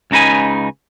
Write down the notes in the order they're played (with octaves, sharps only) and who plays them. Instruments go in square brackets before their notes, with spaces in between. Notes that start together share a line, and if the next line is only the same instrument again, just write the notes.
[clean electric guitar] C#2 C#3 D#4 B4 G#5